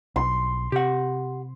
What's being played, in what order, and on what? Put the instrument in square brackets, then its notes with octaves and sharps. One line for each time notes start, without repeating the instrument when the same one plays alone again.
[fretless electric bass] B1 [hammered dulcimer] C6
[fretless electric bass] C3 [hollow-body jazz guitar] G4 F#5